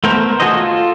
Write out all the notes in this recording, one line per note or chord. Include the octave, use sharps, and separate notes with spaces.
A3 B3 A4 A#4 C5
F#4 G#4 A4 C5 D#5
F4 A4